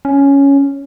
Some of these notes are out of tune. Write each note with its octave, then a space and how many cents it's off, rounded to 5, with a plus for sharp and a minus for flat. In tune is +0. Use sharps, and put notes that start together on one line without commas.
C#4 +5